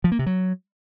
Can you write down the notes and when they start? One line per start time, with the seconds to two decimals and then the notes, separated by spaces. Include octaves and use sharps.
0.04 F3
0.12 A#3
0.19 C3
0.26 F#3